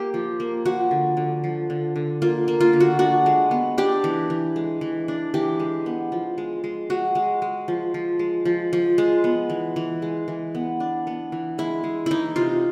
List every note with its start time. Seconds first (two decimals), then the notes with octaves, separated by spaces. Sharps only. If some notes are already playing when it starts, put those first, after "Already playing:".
Already playing: A#3 G4
0.14 F3
0.40 A#3
0.65 F3 F#4
0.91 D3
1.17 D3
1.44 F3
1.70 D3
1.96 D3
2.22 A#3 F4
2.48 A#3
2.60 F4
2.73 D3
2.80 F#4
2.99 D4 F#4
3.26 G#3
3.51 B3
3.78 D4 G4
4.04 E3
4.30 E3
4.56 G#3
4.81 E3
5.08 D4
5.34 E3 G4
5.60 G#3
5.86 B3
6.12 F3
6.38 G#3
6.64 G#3
6.90 G#3 F#4
7.15 G#3
7.42 G#3
7.68 F3
7.94 F3
8.19 G#3
8.45 F3
8.73 F3
8.98 G#3
9.24 B3
9.50 E3
9.76 E3
10.02 G#3
10.28 E3
10.55 B3
10.80 D4
11.07 B3
11.32 E3
11.58 G#3 E4
11.84 G#3
12.06 E3 D#4 E4
12.36 C3 F4